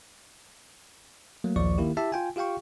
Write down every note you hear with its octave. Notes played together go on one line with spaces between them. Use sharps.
F#3 A3 A#3
A#1 D#2 F3 D5 C#6
D#3 A#3 E4 G4
E4 G4 E5 A5
F4 G5 G#5
F4 G4 F5 G5 C#6